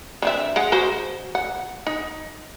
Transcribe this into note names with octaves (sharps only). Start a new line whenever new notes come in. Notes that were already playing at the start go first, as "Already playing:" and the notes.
D3 C4 E5
G#3 F#5
F#4 G#4 C5
F#5
D#4